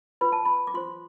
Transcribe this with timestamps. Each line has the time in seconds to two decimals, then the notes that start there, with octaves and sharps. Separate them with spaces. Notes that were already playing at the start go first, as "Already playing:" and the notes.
0.21 F4 B4 B5
0.32 A5
0.45 B5
0.67 D6
0.74 F4 C5 C6